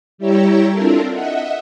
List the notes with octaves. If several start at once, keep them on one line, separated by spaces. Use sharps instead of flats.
G3 E4 G4 C#5 A#5 E6
C4 D4 E4 F4 A4 A#4
D#5 E5 F#5